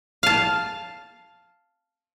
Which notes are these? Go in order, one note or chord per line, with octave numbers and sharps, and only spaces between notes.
F5 A5